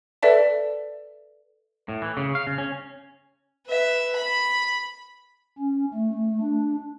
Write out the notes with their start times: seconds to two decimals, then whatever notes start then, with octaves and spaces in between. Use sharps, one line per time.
0.23 A4 B4 D5 E5 A5
1.89 A2
2.02 E3
2.17 C#3
2.35 F5
2.47 C#3
2.58 C#4
3.67 B4 E5
4.16 B5
5.58 C#4
5.94 A3
6.41 D4